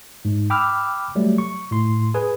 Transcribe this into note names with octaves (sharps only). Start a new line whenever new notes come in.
G#2
G5 B5 D6 E6 F6
F#3 G3 A3
C#6
A2 C6
G#4 B4 G#5